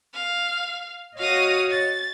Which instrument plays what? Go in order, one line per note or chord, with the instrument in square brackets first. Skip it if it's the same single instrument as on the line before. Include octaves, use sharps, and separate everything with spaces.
[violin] F5
[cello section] F#4 C#5 D#5 [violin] F5 D#6
[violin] A6